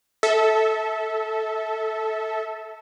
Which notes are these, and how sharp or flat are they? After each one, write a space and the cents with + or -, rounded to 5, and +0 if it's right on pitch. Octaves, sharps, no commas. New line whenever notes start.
A4 -5 E5 -25